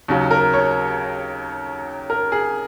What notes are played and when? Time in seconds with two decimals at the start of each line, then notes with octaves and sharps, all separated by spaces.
0.08 D#2 C#3 F#3
0.31 A#4
0.54 C#5
2.10 A#4
2.32 G#4